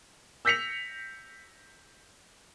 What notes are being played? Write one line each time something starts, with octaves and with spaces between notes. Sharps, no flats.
E6 G6 A#6 B6 C#7 F7